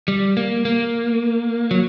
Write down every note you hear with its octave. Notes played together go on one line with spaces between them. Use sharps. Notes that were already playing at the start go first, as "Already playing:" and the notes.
G3
A#3
A#3
F#3